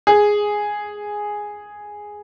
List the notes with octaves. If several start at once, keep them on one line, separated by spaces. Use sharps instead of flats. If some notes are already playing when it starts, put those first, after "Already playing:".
G#4